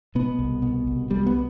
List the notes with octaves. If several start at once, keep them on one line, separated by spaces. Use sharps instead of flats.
B2 B3
C2
B2
C2
B2 G3
B3